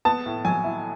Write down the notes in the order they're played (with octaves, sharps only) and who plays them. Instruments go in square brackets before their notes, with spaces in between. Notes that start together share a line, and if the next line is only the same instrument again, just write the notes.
[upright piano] B3 A5
A2
F#3 G#5
E4